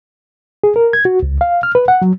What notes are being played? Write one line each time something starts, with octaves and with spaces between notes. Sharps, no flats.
G#4
A#4
G#6
F#4
C#2
F5
F6
B4
F#5
F#3